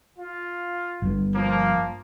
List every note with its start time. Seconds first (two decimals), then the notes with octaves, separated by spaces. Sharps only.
0.18 F4
1.02 G1 G2
1.34 F3 A#3